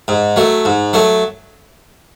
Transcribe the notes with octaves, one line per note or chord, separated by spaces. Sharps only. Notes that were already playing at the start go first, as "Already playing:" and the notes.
G#2
F#3 A3
G#2
F#3 A3